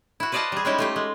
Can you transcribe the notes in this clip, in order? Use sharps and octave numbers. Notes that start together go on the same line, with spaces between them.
E4 F#4
B4 C5 D5 D#5 F5 A5
G3 G#4
G3 G#3 C#4 D#4 E4 G4
A3 F4 G4
G#3